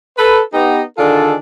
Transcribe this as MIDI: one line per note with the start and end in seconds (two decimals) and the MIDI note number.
0.18 0.40 69
0.18 0.40 71
0.53 0.82 59
0.53 0.82 63
0.53 0.82 67
0.97 1.35 50
0.97 1.35 51
0.97 1.35 62
0.97 1.35 65
0.97 1.35 68
0.97 1.35 69